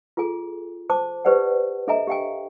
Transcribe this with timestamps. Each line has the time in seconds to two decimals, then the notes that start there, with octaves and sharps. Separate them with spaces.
0.17 F4 G#4 A4 G#5
0.90 C5 A5 D6
1.25 G4 B4 C5 D5 F#5
1.88 D4 A4 D#5 E5 G#5 A#5
2.07 G4 F5 G5 G#5